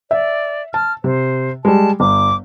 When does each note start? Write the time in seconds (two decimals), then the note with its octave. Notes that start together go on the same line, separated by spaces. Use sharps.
0.11 D5 E5
0.74 A5 F6
1.04 C3 C5
1.65 G3 G#3 A5
2.00 G1 D6